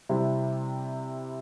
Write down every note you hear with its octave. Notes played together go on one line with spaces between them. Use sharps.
C3 G3 C4 E4